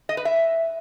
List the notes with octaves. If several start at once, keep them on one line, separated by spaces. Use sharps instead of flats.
D#5
B4
E5